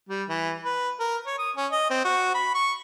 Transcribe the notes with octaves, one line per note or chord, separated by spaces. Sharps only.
G3
E3
B4
A#4
C#5
D#6
C#4
D#5
C4
F#4
B5
C#6